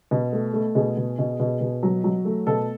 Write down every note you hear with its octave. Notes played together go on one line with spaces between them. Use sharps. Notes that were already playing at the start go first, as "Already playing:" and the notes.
B2
A3
A3
B2 G#4
B2
B2
B2
B2
F#3
F#3
A3
B2 A4